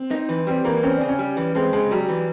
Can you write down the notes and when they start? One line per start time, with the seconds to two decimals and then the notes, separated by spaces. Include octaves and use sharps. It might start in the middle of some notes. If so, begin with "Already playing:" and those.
Already playing: C4
0.11 D#4
0.29 E3
0.47 G3 C4
0.64 E3 A#3
0.83 C4 C#4
0.96 D4
1.01 C#3
1.09 C#4
1.19 G3
1.37 E3
1.55 G#3 C4
1.73 C#3 G#3
1.91 F#3 G3
2.09 E3